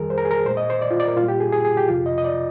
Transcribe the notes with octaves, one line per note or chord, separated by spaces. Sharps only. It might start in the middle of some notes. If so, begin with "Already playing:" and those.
Already playing: F2 D#3 G3 G#4 A#4
C5
A#4
G#4
A#4
A#2 G#3 C5
D#5
C5
D5
F4
D5
A#4
A#2 G3 F4
G4
G#4
G#4
G#4
G4
F2 C3 F3 F4
D#5
D#5
D5